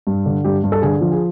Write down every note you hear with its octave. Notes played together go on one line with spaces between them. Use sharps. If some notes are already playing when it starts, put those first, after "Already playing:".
G2
D3
G2 G4
G2
A4
D3 G#4
F3
G#4